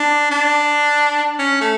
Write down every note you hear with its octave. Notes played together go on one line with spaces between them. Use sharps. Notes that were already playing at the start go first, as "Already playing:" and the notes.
Already playing: D4
D4
C#4
A3